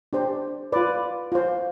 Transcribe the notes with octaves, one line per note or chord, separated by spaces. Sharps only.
D4 G4 C5
F4 B4 D5
F4 C5